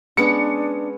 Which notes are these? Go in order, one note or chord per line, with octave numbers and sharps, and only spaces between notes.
G#3 B3 C#4 D4 C#7